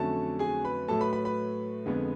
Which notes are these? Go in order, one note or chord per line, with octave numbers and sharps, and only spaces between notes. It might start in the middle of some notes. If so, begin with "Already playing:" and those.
Already playing: F2 D3 F#3 A3 C#4 A4 A5
G#4 G#5
B4 B5
A2 F#3 A3 A4 A5
B4 B5
B4 B5
B4 B5
F2 D3 G#3 B3